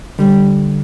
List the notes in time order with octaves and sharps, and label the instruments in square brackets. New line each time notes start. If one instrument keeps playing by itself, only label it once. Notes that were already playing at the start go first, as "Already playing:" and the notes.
[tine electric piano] D3 [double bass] G3